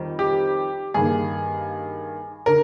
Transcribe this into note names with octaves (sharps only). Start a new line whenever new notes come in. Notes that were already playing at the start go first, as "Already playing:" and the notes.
Already playing: F2 D#3 G3
G4
G2 D#3 A#3 G#4
D3 A#4